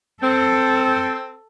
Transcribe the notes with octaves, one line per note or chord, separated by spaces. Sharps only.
C4 A4